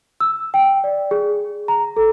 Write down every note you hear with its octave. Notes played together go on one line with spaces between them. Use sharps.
E6
G5
D5
G#4
A#5
A4